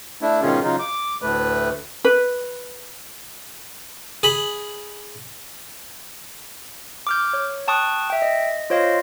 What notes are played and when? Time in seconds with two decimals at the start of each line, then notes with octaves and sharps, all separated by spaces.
0.22 A3 D4 E4
0.42 G#2 B2 D#3 C#4 F4 G#4
0.63 C#3 F#3 D#4 F4
0.79 D6
1.22 D2 A2 A3 B4
2.05 B4
4.23 G#4 B5
7.07 D6 F6 G6
7.33 C#5
7.68 G5 A5 C#6 D#6 F#6
8.10 E5 G5
8.22 D#5
8.70 F4 C5 C#5 D#5 F5